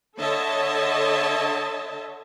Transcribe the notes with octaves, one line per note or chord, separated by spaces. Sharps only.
D3 A4 C#5 D#5 E5 A5